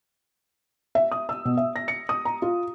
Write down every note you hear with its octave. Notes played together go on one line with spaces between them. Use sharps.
E5
D#6
E6
B2
E5
A#6
C#7
D#6
A#5
F4